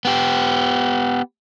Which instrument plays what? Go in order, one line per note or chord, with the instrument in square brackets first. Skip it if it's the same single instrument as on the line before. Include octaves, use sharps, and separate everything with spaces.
[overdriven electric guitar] B3 G4